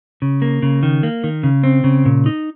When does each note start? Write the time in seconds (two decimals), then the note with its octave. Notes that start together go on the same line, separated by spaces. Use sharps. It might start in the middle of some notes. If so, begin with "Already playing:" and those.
0.22 C#3
0.42 A#3
0.62 C#3
0.83 D#3
1.03 A#3
1.24 D#3
1.43 C#3
1.64 C4
1.84 C#3
2.05 A#2
2.26 D#4